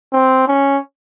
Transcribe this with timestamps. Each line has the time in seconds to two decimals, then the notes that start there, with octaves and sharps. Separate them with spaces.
0.13 C4
0.48 C#4